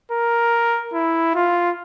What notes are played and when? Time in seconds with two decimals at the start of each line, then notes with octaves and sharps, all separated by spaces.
0.12 A#4
0.94 E4
1.35 F4